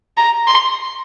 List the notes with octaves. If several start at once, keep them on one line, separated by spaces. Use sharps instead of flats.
A#5
C6